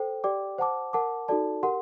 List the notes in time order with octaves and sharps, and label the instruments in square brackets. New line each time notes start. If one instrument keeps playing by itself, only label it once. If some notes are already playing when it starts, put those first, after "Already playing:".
Already playing: [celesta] A4 C5 G5
G4 D5 G5 D6
C5 F#5 A5 D6
A#4 F#5 A5 D6
D#4 F#4 A4 D5 A5
G4 A#4 F#5 C6